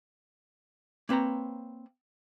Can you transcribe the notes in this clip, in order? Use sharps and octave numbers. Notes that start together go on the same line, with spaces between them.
A#3 C4 B4 C#5 A#5